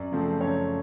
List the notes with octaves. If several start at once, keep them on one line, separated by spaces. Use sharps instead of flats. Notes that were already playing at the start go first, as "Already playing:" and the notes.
Already playing: F#2 D5
C#3 F3 A3 C4
F#2 C#5